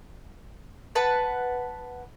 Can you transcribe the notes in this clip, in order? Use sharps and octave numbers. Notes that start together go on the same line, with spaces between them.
B4 F#5 A5